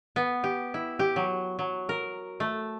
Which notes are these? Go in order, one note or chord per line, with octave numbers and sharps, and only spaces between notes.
B3
G4
E4
G4
F#3
F#3
A#4
A3